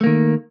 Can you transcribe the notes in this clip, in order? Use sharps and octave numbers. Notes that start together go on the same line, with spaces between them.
D#3 A3 A#3